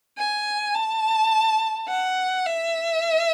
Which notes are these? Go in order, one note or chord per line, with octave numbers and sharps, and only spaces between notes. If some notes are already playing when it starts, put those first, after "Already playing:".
G#5
A5
F#5
E5